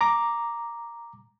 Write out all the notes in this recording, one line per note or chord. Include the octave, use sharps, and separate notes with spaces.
A#5 D6